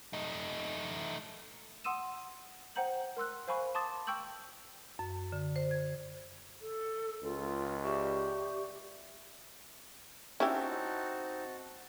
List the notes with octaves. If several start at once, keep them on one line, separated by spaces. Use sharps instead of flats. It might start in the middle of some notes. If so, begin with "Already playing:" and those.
A3 D#4
F#5 C6 D#6 E6 D#7 E7
C5 F#5 G5 A#5 G6 F#7
A#4 C6 E6 F#6
C5 F5 G#5 B5 C#6
A5 C6 D6 D#6 A6
G5 C#6 E6 G6 F#7
F#2
D3
C5
G#6
A4
C#2 F4
G4 D5 E5 C#6
C4 C#4 D#4 E4 F#4 G4 A5